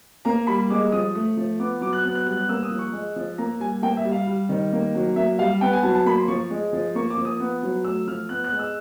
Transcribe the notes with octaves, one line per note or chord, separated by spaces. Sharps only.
A#3 A#5
G3 B5
G#3 D6
F3 D#6
A3
F3
B3 D6
F#3 D6
F#6
B3 F#6
F#6
G3 F#6
F#6
A#3 E6
D#6
F3
C#6
G#3
F3
A#3 A#5
G3 G#5
A#3 G5
E5
G3
F5
G3
D#3
A#3
F#3
A#3 E5
G3 F5
B3 G5
G#5
F#3 A5
A5
A#3 B5
C6
F3 C#6
G#3
F3
A#3 C#6
D6
F3
D#6
B3
F#3
A3 E6
F3 F6
B3 F#6
F#6
G#3
E6